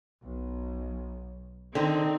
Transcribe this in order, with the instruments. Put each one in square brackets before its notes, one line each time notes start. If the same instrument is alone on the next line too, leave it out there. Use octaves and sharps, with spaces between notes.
[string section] B1
[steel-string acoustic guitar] D3 [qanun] D#3 D#4 [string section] C4